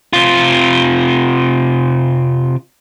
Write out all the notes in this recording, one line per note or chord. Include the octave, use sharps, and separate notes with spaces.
C3 F4